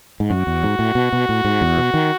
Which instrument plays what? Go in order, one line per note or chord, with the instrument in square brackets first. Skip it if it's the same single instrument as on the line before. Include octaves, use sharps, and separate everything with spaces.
[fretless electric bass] G#2
[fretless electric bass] F#2 [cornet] F#4
[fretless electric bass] E2
G#2
A2
B2
B2
A2
G#2
E2
B2
D#3